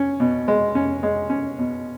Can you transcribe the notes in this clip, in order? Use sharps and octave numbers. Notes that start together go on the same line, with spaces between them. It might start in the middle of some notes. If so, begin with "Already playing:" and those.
Already playing: C#4
B2
G#3
C#4
G#3
C#4
B2